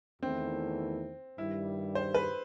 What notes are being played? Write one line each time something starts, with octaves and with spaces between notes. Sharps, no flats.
E2 D#3 A3 C4 E4
G2 D#3 G3 E4
C5
B4